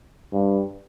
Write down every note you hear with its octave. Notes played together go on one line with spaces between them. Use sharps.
G2